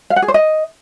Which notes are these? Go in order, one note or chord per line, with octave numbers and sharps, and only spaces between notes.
F5
F#5
G#4
C5
D#5